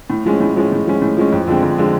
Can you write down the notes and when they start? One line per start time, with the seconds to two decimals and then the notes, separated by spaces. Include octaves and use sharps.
0.10 A2
0.25 F3 G#3 C#4
0.40 A2
0.56 F3 G#3 C#4
0.72 A2
0.86 F3 G#3 C#4
1.02 A2
1.17 F3 G#3 C#4
1.32 F2
1.47 D3 F3 G#3 C4
1.63 F2
1.78 D3 F3 G#3 C4